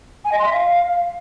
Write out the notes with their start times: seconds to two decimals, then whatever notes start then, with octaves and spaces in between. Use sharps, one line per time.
0.24 G#5
0.31 D#5
0.38 C6
0.45 E5
0.52 F5